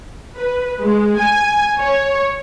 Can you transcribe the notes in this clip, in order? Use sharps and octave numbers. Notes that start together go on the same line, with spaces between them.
B4
G#3
G#5
C#5